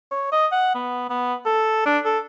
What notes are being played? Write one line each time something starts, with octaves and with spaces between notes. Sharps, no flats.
C#5
D#5
F#5
B3
B3
A4
D4
A4